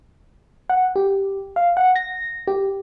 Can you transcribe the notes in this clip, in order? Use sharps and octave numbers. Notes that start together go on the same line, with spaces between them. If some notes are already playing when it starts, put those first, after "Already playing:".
F#5
G4
F5
F#5
A#6
G4